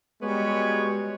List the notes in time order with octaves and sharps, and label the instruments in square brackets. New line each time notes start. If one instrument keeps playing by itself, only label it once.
[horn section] G3 G#3 B3 F#4 C#5